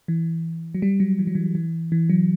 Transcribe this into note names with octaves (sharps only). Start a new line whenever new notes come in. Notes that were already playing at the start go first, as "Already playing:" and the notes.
E3
F#3
G3
F#3
E3
F#3
E3
E3
E3
F#3